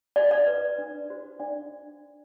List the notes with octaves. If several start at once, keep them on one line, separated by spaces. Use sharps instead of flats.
F#4 D5
D5
B4
D4
F#4 C5
D4 D5